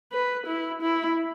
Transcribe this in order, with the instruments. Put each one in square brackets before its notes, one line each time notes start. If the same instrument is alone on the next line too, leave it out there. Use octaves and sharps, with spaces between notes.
[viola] B4
E4
E4